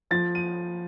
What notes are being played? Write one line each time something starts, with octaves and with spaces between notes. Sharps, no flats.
F3 A6
D#7